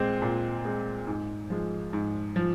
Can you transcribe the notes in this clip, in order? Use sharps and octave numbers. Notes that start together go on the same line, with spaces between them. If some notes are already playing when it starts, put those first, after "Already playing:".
Already playing: A#2 G#3 C4
A#2
G#3 C4
G#2
F3 G#3
G#2
F3